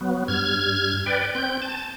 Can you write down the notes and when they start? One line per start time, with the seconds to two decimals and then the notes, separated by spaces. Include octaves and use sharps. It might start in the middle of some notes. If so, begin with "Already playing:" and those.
0.01 F#3 B3
0.28 G2 F6 G#6
1.06 B4 D5 G5
1.35 C4 G6
1.62 A5